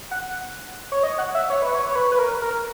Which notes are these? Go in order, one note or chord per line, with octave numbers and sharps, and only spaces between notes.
F#5
C#5
D#5
F#5
E5
C#5
B4
C#5
C#5
B4
B4
A#4
A#4